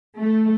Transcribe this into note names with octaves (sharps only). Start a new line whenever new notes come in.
A3